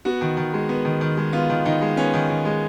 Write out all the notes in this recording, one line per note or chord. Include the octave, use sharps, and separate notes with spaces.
B3 F#4
D#3
D#3
G#3
B3
D#3
D#3
G#3
B3 F4
D#3
D#3 D#4
G#3
B3 C#4
D#3
D#3
G#3